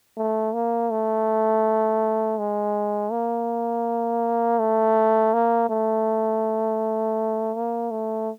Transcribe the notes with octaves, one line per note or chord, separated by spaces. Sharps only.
A3
A#3
A3
G#3
A#3
A3
A#3
A3
A#3
A3